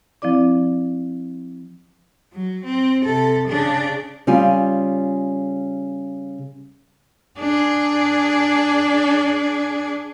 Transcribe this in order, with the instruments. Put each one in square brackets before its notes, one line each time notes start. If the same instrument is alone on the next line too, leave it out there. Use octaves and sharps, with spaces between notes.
[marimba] F3 C4 E4 D5 D6
[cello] F#3
C4
C3 A4
C#3 D4
[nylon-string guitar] C#3 G3 F4 G#5
[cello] D4 G#4